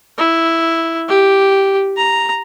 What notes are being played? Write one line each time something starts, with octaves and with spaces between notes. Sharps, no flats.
E4
G4
A#5